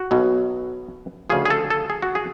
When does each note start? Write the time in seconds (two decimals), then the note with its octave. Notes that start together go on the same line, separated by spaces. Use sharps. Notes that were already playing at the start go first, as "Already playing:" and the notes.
Already playing: F#4
0.11 B1 B2 F#3
1.30 D2 C#3 F3 G#4
1.45 G#4
1.50 A4
1.70 A4
1.90 G#4
2.02 F#4
2.15 G#4